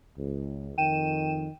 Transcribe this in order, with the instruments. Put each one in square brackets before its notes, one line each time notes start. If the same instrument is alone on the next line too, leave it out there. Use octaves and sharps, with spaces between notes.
[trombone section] C#2
[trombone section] F2 D#3 [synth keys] G5 D#7 E7